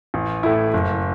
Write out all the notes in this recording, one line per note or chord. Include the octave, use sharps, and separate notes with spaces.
A1
A2 A3 E4
F#1